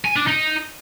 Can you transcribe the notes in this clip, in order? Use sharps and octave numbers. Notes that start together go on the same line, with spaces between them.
G#5
D4
D#4